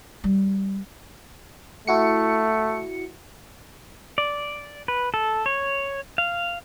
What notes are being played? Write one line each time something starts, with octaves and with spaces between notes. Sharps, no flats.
G3
A3 E4 F#4 C#7
D5
B4
A4
C#5
F5